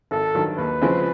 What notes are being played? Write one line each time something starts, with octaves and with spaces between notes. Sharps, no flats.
G#1 A4
G2 D#3 F#3
D#2 B4
C#3 F3 G#3 C4